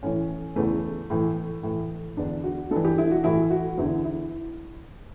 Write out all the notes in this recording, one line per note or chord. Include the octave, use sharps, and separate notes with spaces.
A2 E3 C#4
E2 C#3 E3 A3
A2 E3
A2 E3
E2 D3 D4
F#4
G2 E3 A4
G4
E4
F#4
A2 E3 E4
F#4
E2 D3 E4
E4